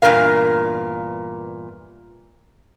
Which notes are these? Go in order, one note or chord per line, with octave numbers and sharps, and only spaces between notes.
E2 G2 A#2 F3 A#4 F5